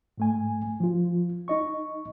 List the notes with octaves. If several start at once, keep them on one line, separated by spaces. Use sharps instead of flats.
G#2 A3 G#5
F3 F4
D#4 D#5 C#6